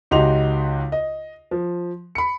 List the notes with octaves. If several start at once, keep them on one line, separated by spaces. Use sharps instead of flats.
C#2 D#4 F#4 G4 C6 F7
D#5
F3
B5 C#7